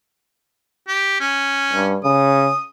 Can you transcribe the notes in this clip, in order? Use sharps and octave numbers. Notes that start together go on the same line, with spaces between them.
G4
C#4
G2
C#3 D#6